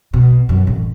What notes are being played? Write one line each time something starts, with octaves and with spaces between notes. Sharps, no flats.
B2
F#2
A1